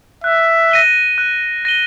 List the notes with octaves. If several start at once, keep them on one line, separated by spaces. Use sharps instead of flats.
E5 F#6
A#6 D#7 G7
F#6
A#6 D#7 G7